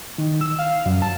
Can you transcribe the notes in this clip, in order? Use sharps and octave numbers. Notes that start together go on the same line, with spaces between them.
D#3
E6
F5
F#2
A5